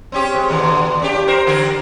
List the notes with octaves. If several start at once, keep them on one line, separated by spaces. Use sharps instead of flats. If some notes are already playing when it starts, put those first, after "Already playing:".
C4 C#4 G4
G#3
D#2 B2 D3
G2 C#4 G4
A#4 C5
D3 G4 A#4